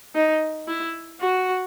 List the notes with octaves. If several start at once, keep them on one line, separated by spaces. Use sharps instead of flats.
D#4
E4
F#4